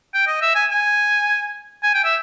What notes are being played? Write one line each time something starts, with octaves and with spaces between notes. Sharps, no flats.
G5
D#5
E5
G#5
G#5
G#5
G5
E5